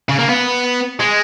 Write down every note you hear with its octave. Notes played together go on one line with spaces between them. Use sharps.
C#3
A#3
B3
G#3